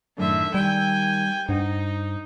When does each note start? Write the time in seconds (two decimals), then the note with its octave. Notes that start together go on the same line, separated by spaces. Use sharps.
0.18 F#2 A2 D3 D#3 E5
0.54 D#3 G3 G5 G#5
1.49 G2 D#4 C5 F#5